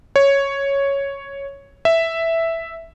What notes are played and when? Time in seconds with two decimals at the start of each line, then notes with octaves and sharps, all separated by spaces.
0.16 C#5
1.85 E5